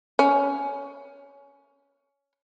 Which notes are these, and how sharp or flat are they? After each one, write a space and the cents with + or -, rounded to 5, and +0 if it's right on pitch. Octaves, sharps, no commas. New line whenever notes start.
C#4 +15